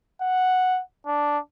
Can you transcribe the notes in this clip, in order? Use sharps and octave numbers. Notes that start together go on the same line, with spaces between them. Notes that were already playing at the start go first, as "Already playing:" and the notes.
F#5
D4